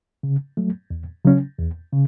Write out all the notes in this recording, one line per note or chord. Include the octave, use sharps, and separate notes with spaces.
C#3
F#3 A3
E2
C#3 F#3 C#4
E2
C#3